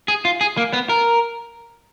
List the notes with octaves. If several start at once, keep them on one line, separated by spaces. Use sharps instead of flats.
G#4
F4
G#4
A#3
B3
A#4